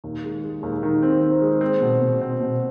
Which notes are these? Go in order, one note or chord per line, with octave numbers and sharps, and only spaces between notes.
D#2
G#3
G#3
D#2
D#3
C4
C4
G#3
C4
B2
B2
C4
B2